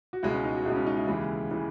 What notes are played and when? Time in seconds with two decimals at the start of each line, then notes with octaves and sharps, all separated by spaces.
0.13 F#4
0.23 C#2 B2 G#3 E4
0.34 C#4
0.44 D#4
0.55 F#4
0.65 C#2 B2 G#3 E4
0.76 C#4
0.86 D#4
0.97 E4
1.08 D#2 C#3 E3 G#3
1.51 C#3 E3 G#3